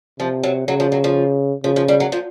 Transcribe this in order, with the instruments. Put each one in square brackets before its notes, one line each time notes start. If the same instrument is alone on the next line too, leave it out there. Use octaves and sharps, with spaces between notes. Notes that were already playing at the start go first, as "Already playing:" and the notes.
[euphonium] C3 [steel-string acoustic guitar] F3
[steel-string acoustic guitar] F#3
[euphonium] C#3 [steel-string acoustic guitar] F#3
[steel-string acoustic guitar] F3
F#3
F3
[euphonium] C#3 [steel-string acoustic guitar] F3
[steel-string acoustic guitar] F3
G3
F#3
F3